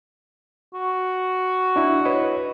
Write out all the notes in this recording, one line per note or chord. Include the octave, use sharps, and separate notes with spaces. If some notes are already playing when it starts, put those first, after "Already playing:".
F#4
D4 E4
B4 C#5 D#5